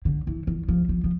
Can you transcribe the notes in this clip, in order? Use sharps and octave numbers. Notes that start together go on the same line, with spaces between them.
D3
E3
E3
F3
F3
F3